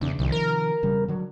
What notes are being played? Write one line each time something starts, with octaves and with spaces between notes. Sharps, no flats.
E1 E2 C#3 D4
C2 C3 D#3 F3
A#4
E1 C#3 G3
D3 F#3